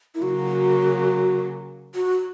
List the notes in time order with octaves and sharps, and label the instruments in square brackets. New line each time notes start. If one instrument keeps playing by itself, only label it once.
[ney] E4
[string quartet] C#3 F#3 A#3 [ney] F#4
[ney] F#4